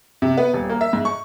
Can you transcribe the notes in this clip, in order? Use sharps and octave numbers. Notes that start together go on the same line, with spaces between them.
C3
B3
D#1
A#3
E5
G#2
C#6